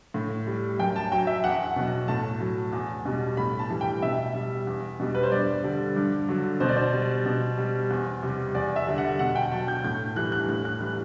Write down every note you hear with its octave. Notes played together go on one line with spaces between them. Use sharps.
A2
G3
F#2 G5
A5
F#3 G5
E5
E2 F#5
B2 F#3
A2 A5
F#3
E2
B2 G3
A2 B5
A5
E3 G3
G5
B2 E5
G3
E2
B2 G3
B4
C5
G2 D5
D3 G3
G2
D3 F#3
B2 C5
D5
C5
G3
B2
G3
E2
C3 G3
E2 D5
E5
D3 G3
F#5
B2 F#5
G5
F#3 A5
G6
A2 G6
E3 G3 F#6
F#6
A2 F#6
F#6
E3 G3 F#6